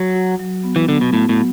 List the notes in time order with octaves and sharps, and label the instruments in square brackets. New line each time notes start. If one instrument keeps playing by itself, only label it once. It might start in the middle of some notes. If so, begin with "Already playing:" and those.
Already playing: [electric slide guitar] F#3
[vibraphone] F#4
F#3
B3
[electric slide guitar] E3
[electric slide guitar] D3 [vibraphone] B3
[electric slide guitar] B2
[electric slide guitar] A2 [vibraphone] F#4
[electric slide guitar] A2
[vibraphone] F#3